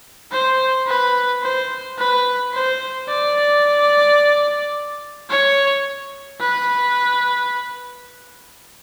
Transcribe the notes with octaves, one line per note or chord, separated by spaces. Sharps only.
C5
B4
C5
B4
C5
D5
C#5
B4